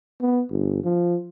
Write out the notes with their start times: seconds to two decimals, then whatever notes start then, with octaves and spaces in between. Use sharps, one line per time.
0.21 B3
0.50 G1
0.84 F3